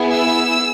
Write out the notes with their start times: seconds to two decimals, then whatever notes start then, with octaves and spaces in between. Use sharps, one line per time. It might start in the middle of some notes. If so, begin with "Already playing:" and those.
Already playing: B3 E4 G#4
0.14 E6